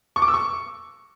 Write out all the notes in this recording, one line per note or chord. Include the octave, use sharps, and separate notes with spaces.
C#6
D6
E6
C#6